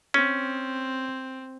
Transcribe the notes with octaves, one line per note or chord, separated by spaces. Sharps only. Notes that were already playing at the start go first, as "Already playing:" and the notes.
C4 C#4